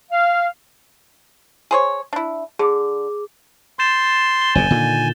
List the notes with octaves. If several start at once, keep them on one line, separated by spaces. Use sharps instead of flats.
F5
G#4 C5 C#5
D4 E4
D3 G#4 D6
C6 G6 A6 E7
G7
F#1 E2 A#2 G#5
A#2 D3 D#3